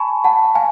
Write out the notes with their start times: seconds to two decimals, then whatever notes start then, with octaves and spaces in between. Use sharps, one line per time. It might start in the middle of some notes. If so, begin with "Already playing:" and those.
Already playing: G#5 A5 B5 C#6
0.24 F#5 A5
0.55 F5 G#5